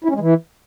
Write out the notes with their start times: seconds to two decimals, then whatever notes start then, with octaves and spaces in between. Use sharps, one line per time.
0.04 E4
0.10 C#4
0.15 G#3
0.20 E3